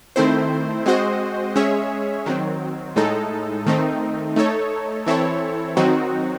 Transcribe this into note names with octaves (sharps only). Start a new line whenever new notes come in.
D#3 A3 C4 E4 C5
G#3 C4 F#4 C5 D#5
G#3 C#4 G#4 C#5 E5
D#3 F#3 C4
A2 G#3 D#4 A4
D#3 A3 C4 D#4
A3 D#4 A4 C#5
E3 C4 E4 A4 C#5
D#3 F#3 C4 D#4 F#4